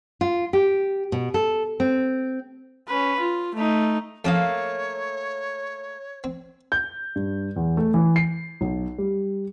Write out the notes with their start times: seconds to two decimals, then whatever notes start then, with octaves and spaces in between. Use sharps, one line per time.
0.21 F4
0.53 G4
1.12 B2
1.34 A4
1.80 C4
2.88 C#4 B4
3.20 F4
3.55 A3 D#4
4.25 F2 A3 A#3 C#4 C#5 F5 D#6
6.24 C4
6.72 G6
7.16 G2
7.56 E2
7.77 A3
7.94 E3
8.16 C7
8.61 B1
8.98 G3